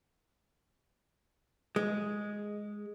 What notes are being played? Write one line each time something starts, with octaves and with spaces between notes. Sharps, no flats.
G#3